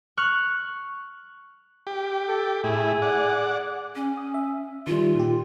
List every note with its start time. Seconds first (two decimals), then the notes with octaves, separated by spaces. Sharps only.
0.17 C#6 F6 F#6
1.87 G4
2.28 A4
2.64 A2 E4 G#4
3.02 D5 F#5
3.95 C#4
4.17 D#6
4.34 E5
4.87 D#3 G3 F4
5.15 A#2 G4